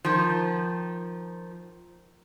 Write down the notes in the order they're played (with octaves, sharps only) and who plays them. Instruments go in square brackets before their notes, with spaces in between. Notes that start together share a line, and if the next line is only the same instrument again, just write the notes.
[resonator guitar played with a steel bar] D#3 F3